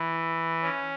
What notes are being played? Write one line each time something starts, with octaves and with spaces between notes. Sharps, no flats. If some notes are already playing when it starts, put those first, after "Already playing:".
Already playing: E3
C#4